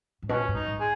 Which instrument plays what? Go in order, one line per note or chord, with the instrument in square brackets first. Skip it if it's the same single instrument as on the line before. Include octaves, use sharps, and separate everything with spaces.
[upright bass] G#2
[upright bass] B2 [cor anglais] C#4
[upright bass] G#2
[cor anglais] D#4
[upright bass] G#2
[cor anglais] G#4